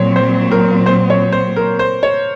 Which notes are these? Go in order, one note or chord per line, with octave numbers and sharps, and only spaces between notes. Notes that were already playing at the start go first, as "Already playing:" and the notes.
Already playing: A#2 F#3 C4 C#5
C5
A#4
C5
C#5
C5
A#4
C5
C#5